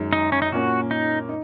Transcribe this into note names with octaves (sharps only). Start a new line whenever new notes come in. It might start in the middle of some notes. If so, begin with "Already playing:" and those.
Already playing: F#2 D#3 G#3
D#4
C#4
D#4
A#2 A#3 C#4 F#4
D#4
D#4